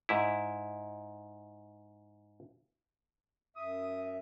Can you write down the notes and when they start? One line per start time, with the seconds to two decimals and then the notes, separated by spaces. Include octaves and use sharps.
0.09 G#2 E4
3.57 F#2 E5 D#6